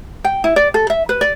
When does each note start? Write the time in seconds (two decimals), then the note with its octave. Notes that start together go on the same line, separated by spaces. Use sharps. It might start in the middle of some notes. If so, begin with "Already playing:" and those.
0.24 G5
0.44 E4
0.56 D5
0.74 A4
0.90 E5
1.09 B4
1.21 D5